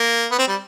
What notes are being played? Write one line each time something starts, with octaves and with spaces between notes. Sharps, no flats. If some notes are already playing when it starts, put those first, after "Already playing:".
Already playing: A#3
B3
C4
G3